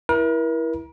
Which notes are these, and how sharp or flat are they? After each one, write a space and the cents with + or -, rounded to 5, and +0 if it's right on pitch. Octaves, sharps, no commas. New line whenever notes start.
E4 +0 A#4 +40